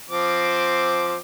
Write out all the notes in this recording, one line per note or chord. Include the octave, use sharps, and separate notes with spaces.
F3 C4 D6